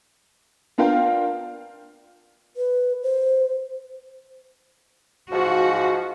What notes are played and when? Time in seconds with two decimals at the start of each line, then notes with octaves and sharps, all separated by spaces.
0.78 B3 D4 F4 A#4 F5 G5
2.57 B4
3.03 C5
5.32 G#2 F3 F#4